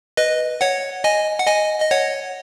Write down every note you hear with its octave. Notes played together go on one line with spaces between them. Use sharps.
B4 D#5
C#5 F#5
D#5 G#5
F#5
D#5 G#5
D#5
C#5 F#5